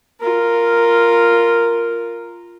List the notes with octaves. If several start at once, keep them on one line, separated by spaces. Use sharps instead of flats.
F4 A#4